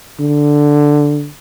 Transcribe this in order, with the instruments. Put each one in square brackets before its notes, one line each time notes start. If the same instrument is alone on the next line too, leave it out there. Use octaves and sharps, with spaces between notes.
[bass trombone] D3